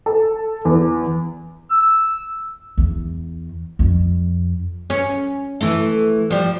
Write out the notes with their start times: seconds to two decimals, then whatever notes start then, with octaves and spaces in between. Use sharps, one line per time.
0.06 A4
0.65 E2
1.71 E6
2.78 E2
3.79 F2
4.90 C#4
5.61 E3 A3
6.31 F3 G3